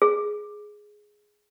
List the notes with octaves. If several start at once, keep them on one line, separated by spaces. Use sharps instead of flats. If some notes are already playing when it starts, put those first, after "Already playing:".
G#4